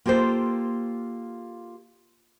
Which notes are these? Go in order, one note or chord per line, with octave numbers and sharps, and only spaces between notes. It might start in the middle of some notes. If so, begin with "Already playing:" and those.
A#3 F4 G4 A4 C5